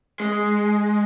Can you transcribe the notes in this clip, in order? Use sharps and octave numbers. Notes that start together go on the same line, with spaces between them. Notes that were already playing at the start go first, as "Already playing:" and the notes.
G#3